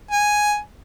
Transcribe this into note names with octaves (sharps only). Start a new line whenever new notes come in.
G#5